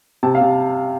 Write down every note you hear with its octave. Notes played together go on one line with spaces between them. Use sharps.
C3 A5
F5
C3